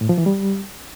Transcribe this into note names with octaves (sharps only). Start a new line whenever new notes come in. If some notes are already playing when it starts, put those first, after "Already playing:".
A2
F3
E3
G3